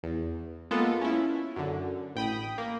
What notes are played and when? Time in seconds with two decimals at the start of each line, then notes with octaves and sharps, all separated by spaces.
0.03 E2
0.71 G#3 A#3 B3 F4 A4
1.01 C#4 E4
1.56 F#2 D3
2.15 A1 G5 B5 D#6
2.58 A#3